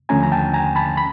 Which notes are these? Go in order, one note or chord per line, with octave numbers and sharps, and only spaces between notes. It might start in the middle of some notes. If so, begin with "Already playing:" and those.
D#2 D3 F3 A3 C#4 G#5 A#5
A#5
G5 A5
G#5 A#5
A5 B5
B5